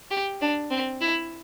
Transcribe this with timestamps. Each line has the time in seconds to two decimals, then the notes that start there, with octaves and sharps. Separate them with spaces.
0.11 G4
0.41 D4
0.70 C4
1.01 E4